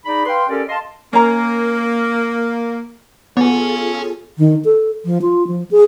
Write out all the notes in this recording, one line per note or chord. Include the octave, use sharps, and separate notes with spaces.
D#4 G#4 D5 B5
B4 F5 G5 C6
C#4 G4 A4 A#4 D5
D#5 F5 A5 C6
A#3 C#4 A#5
B3 F4 G#4 A4 C#5 G#5
D#3
A4
F3
F4
F3
G#4